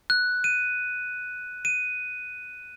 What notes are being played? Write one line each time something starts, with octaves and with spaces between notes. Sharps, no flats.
F#6
D#7
D#7